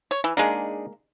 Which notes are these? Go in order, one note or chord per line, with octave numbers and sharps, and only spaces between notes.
C#5
E3
G#3 A#3 D4 D#4 G#4